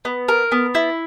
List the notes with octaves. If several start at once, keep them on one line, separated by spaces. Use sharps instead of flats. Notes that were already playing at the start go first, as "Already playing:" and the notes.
B3
A#4
B3
E4